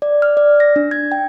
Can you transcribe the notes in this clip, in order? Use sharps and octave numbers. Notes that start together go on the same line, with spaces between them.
D5
F6
D5
A#6
D4
G#6
G5